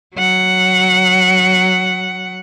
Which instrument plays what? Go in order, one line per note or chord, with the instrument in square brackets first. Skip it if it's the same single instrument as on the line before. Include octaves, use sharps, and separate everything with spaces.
[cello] F#3 F#5